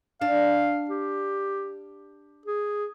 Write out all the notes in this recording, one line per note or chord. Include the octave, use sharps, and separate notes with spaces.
D4 F5
G4
G#4